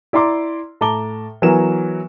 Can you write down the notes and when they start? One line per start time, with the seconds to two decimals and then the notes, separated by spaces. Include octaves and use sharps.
0.13 E4 D5 A#5 C6 D6
0.81 A2 A5 A#5 D6 G7
1.42 E3 F#3 B3 A#4 G#5 E7